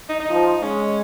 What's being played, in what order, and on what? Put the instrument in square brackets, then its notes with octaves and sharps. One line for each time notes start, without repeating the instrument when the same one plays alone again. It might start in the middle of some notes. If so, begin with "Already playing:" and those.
[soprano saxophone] D#4
D#4
[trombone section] F3
[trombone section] G#3 [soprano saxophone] C#4